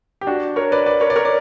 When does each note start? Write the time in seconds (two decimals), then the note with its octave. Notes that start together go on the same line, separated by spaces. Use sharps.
0.21 G4
0.27 D4 F#4
0.56 A#4 C#5
0.72 B4 D5
0.86 B4 D5
1.01 A#4 C#5
1.10 D5
1.16 A#4 C#5
1.25 D5